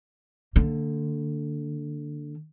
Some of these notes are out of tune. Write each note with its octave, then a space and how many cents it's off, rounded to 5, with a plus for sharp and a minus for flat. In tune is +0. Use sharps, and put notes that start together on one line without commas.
D3 +10 A#3 -40